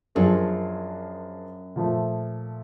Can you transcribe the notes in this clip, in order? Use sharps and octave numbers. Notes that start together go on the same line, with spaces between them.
F#2 F3 A#3 D4 F4 G#4
A#2 F3 A3